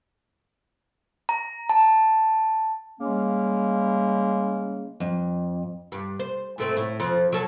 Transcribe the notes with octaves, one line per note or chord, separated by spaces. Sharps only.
A#5
A5
C#3 G3 G#3 A#3 C#4
F2
G2
C5
G#2 A3 C4
A2
F2 F3
F#3 A4